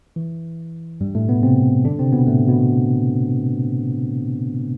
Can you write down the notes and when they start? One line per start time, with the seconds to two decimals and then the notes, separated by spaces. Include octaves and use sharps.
0.16 E3
1.01 G2 G3
1.15 A2 A3
1.28 B2 B3
1.43 C3 C4
1.85 D3 D4
1.99 C3 C4
2.13 B2 B3
2.27 A2 A3
2.48 B2 B3